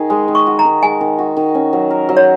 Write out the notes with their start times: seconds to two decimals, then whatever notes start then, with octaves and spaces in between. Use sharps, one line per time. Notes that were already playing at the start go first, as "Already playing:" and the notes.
Already playing: D#3 D#4 G#4
0.10 G#3
0.28 D#3
0.35 C#6
0.47 F#4
0.59 A#5
0.65 D#3
0.83 G#3 G#5
1.01 D#3
1.19 F#4
1.37 D#3
1.55 C#4
1.73 F#3
1.90 A#4
2.09 F#3
2.17 C#5